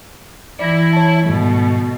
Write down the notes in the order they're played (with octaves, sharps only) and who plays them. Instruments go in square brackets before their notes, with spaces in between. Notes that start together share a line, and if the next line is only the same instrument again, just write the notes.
[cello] E3 E4 [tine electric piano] D5 A#6
[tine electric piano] C#5 A5
[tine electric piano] G#2 D#3 G3 [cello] B2 A3